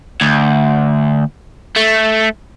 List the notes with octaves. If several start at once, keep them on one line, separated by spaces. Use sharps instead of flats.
D2
A3